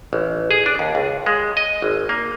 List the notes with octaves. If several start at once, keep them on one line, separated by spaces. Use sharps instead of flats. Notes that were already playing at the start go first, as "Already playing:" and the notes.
A1
G#4
D4
D#2
C#2
G#3
D#5
G#1
A#3